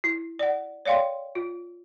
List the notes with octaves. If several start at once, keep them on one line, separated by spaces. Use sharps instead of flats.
E4
D5 F#5
C#5 D5 F5 G5 C6
F4